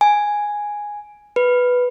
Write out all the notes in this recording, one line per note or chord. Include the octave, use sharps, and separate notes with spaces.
G#5
B4